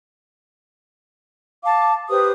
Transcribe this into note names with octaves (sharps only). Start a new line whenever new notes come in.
F5 A5 D6
G4 B4 C5 D#6